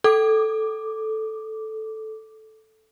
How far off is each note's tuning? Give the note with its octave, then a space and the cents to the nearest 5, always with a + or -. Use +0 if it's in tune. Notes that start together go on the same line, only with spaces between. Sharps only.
A4 -5 D6 +0